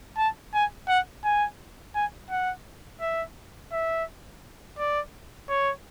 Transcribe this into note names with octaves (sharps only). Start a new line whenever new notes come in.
A5
G#5
F#5
G#5
G#5
F#5
E5
E5
D5
C#5